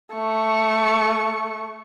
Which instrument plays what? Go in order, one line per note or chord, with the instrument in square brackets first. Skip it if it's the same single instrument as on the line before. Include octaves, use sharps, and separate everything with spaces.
[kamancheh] A3 C#6